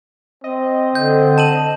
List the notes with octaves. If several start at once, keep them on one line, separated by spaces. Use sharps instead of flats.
C4 D#5
D3 G6
A5 D#7 F#7